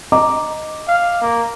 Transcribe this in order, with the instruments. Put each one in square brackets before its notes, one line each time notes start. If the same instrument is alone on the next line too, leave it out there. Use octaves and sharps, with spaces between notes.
[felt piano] D#5 A#5 D6
[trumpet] F5
A#3